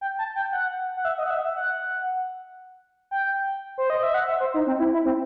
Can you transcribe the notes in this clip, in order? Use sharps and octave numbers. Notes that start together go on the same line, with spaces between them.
G5
A5
G5
F#5
F#5
E5
D#5
F#5
E5
E5
F#5
G5
C5
D#5
E5
F#5
E5
C5
D#4
C4
E4
E4
C4